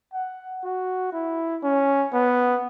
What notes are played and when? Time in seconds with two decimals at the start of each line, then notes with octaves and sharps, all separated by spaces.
0.13 F#5
0.64 F#4
1.13 E4
1.63 C#4
2.13 B3